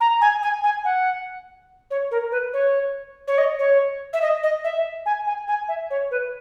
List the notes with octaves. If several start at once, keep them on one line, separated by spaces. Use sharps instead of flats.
A#5
G#5
G#5
G#5
F#5
C#5
A#4
B4
C#5
C#5
D#5
C#5
E5
D#5
D#5
E5
G#5
G#5
G#5
E5
C#5
B4